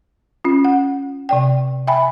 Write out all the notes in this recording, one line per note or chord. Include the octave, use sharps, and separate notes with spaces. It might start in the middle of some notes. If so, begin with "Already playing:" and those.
C#4 F4
F#5
C3 D5 G5
E5 G5 G#5 B5